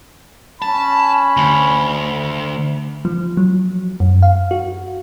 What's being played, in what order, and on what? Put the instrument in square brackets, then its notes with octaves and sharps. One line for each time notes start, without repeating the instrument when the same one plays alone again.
[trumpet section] C#4 B5 [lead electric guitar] A5
[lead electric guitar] D2
[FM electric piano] F3
F#3
F#2
F5
F#4